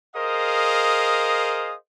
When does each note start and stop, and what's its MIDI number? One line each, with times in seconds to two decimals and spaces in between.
0.16 1.76 68
0.16 1.76 70
0.16 1.76 72
0.16 1.76 75
0.16 1.76 77
0.16 1.76 87